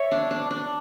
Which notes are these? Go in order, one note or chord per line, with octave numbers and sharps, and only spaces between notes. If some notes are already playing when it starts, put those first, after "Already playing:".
Already playing: C#5 E5
D4
D4
D4